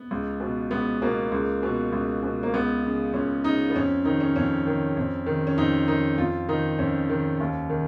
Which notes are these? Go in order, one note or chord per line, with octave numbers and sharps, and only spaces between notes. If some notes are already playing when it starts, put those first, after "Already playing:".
Already playing: B3
C#2
B2
C#2 B3
B2 A#3
C#2
B2
C#2
B2
A#3
C#2 B3
C#3
C#2 C#4
C#3 D#4
B3
F2 C#4
D#3 D#4
C#4
F2 C#4
D#3
F2
D#3
C#4
F2 D#4
D#3 D#4
F2 F4
D#3 D#4
F2 C#4
D#3
D#2
D#3